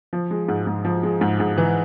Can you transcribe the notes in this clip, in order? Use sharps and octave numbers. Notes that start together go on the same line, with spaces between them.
F3
G#3
G#2
G#2
F3
G#3
G#2
G#2
E3